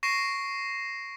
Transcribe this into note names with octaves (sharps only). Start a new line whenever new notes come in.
C#6 A#6 C7 D7 E7